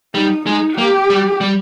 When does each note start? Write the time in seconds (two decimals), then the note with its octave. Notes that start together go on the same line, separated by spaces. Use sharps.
0.15 G3 D#4
0.46 G#3 D#4
0.78 A#3 G4
1.10 G3
1.41 G3